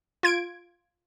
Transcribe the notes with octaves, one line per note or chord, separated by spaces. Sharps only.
F4 G#6 D7